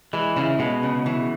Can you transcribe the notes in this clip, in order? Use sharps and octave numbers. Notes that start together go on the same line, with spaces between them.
E3 G#3
C#3 E4
B2 G#3
C#3
E3